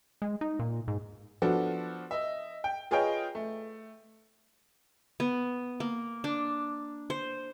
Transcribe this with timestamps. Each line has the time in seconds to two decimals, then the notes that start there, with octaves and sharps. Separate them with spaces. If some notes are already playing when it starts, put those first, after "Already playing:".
0.22 G#3
0.41 D#4
0.59 A#2
0.88 G#2
1.42 F3 B3 D4 F#4 A4
2.11 D#5 E5
2.64 G5
2.91 F4 G#4 B4 C#5 D#5 G5
3.35 A3
5.20 B3
5.80 A#3
6.24 D4
7.10 C5